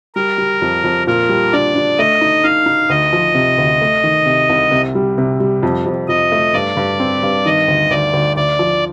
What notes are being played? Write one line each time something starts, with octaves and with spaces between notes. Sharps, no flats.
G3 A#4
G3
F2
F2
A#2 A#4
G3
D4 D5
D4
A3 D#5
D#4
D#4 F5
D#4
D2 D#5
F3
C3
D2
A3
D#3
C3
C2
C3
G3
C3
G3
F2
F2
F2 D#5
A3
G2 D5
G2
C4
G2
D#3 D#5
D2
D2 D5
D2
D2 D5
F3